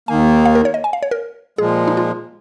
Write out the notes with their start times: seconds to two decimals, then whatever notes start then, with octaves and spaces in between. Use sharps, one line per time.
0.08 D#2 D#3 A#3 G#5
0.45 F5
0.55 A#4
0.65 C#5
0.74 D#5
0.84 G#5
0.93 F5
1.03 C#5
1.11 A#4
1.58 A#2 F3 G#3 G#4
1.88 D#4
1.97 F4